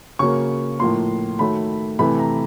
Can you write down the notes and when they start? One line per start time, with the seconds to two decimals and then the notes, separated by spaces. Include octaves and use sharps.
0.19 C#3 F#3 A#3 C#6
0.79 A2 F3 A#3 C6
1.39 D#3 F#3 A3 B5
1.99 C3 E3 A3 B5
2.19 A#5